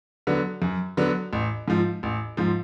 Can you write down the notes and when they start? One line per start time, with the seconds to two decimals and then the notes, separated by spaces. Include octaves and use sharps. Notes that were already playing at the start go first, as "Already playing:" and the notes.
0.27 D3 F#3 B3
0.62 F#2
0.97 D3 F#3 B3
1.33 A1
1.68 G#2 F3
2.03 A1
2.37 G#2 F3